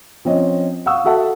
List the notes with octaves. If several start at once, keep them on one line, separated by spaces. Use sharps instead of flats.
F3 C4 C#4 D#5
F5 F#5 C#6 D#6 E6
F#4 A4 E5 F#5 A5